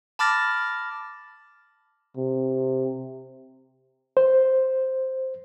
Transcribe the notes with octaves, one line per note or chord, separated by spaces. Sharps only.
A5 B5 D6 F6 A6 A#6
C3
C5